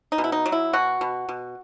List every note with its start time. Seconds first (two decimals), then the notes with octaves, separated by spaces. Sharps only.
0.12 D#4
0.18 B2
0.24 E4
0.32 D#4
0.46 F#3
0.52 E4
0.73 B2 F#4
1.01 B2
1.29 B2